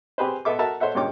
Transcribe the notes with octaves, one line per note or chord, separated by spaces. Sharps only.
C4 G4 G#4 B4 C5
B3 A4 E5 D6
F#4 A4 A#4 E5 A5
A4 C5 C#5 E5 F#5
G2 A#2 C#3 C#5 G5 D6